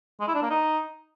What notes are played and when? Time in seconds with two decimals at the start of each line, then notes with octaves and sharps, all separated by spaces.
0.20 G#3
0.28 E4
0.35 D4
0.43 A#3
0.50 D#4